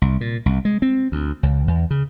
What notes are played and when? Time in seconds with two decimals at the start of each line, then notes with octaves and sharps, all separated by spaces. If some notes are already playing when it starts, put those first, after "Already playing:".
0.02 C2
0.21 A#2
0.46 C2
0.65 G#3
0.82 C4
1.12 D2
1.43 C#2
1.67 E2
1.91 C#3